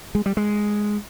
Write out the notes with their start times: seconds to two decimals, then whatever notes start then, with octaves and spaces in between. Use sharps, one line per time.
0.15 G#3
0.26 G3
0.37 G#3